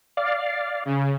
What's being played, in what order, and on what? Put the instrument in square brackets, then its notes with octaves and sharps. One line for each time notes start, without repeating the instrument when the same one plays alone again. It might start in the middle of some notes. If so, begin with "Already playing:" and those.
[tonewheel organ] D5 F5
[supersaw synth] C#3